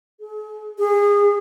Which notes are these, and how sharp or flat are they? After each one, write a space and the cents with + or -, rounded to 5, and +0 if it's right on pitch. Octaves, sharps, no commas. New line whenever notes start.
G#4 +40
G#4 -30